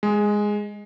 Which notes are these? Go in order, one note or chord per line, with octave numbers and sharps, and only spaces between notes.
G#3